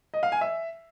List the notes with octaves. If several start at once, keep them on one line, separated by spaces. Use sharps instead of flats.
D#5
F5
G#5
E5